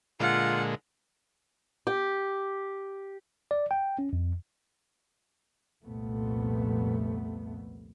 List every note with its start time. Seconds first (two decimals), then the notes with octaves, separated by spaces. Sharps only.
0.20 A#2 D3 G#3 F4 F#5
1.87 G4
3.51 D5
3.71 G5
3.99 C#4
4.13 F2
5.84 C2 F2 A#2 A3 B3